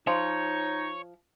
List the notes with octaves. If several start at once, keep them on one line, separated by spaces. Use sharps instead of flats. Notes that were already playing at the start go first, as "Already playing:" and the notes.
F3 D#4 C#5